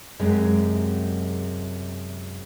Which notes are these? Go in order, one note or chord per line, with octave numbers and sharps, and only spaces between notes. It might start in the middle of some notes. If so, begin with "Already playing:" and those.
F#2 C3 G#3